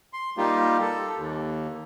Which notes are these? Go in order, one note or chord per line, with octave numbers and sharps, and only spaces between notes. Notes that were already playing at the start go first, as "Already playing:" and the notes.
C6
G3 A#3 D#4 F4 G4
A4
D#2